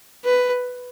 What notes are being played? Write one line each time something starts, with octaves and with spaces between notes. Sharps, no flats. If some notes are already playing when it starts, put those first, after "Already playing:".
B4